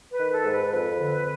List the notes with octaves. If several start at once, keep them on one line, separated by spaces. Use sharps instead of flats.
B4
D#3
A4
G#2
B4
F2 B4
D3